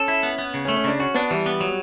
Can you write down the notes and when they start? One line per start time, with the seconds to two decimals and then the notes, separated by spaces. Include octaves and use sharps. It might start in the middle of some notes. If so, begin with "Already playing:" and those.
Already playing: C#4 A4
0.08 E4
0.23 B3
0.38 B3
0.54 C#3
0.65 C#4
0.68 A3
0.76 C#4
0.84 C#3 D4
0.99 C#4 F#4
1.14 B3 D4
1.31 E3 G3
1.46 B3
1.61 F#3